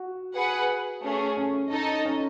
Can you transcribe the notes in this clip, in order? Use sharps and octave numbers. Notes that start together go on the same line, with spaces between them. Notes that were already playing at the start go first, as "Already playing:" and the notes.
Already playing: F#4
G#4 B4 F#5
A3 C#4 G#4
C#4
D#4 A4 D#5 A5
C#4